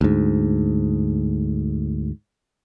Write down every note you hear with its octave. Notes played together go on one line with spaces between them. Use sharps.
D2 G#2